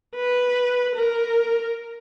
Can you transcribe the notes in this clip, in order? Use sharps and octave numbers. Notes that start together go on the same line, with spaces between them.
B4
A#4